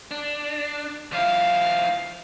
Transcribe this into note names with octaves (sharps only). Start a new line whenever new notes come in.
D4
F3 E4 F5